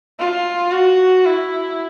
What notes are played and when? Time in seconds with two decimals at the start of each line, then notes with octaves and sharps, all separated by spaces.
0.19 F4
0.72 F#4
1.25 E4